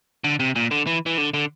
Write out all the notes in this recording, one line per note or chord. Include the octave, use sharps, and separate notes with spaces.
D3
C3
A#2
D3
E3
E3
D3
D3